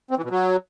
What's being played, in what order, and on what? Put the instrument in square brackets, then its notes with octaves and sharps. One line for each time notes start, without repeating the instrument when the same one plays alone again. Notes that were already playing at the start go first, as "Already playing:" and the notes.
[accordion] C4
E3
B2
F#3